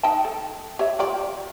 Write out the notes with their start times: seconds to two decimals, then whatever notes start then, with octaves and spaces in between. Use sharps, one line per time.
0.03 D#4 G5 A5
0.25 A4
0.79 G4 C#5 E5
0.99 F4 G4 D5